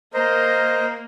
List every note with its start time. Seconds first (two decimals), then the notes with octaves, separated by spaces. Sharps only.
0.14 A#3 A#4 C5 D#5